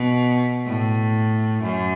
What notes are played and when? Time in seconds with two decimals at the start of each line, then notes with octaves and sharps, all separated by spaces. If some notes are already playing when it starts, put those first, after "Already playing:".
Already playing: B2
0.66 A2
1.64 F#2